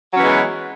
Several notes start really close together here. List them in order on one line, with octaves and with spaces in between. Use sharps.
F#3 C#4 E3 G#3 B3